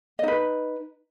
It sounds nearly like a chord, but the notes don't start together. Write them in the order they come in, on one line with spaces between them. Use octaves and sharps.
D#5 D#4 B4